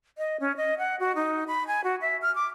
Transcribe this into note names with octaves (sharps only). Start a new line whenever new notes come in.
D#5
C#4
D#5
F#5
F#4
D#4
B5
G#5
F#4
E5
F6
D6